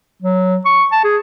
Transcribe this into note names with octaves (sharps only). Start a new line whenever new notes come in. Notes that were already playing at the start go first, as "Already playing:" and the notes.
F#3
C#6
A5
G#4